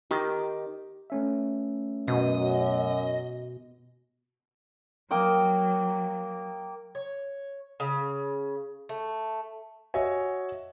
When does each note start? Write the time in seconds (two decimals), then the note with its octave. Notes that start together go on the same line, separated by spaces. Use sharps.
0.11 D#3 G4
1.10 A3 C#4 E5
2.08 F#2 B2 D#5
5.11 F#3 A#3 G5 D#6
6.95 C#5
7.80 C#3
8.89 A3
9.94 F#4 C#5 D#5 E5 G#5